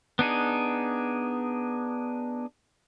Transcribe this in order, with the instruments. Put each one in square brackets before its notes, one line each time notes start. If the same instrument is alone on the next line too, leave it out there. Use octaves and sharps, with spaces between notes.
[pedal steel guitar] B3 D4 D#4 G#4